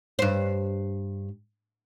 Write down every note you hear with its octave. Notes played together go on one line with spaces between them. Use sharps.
G2 C5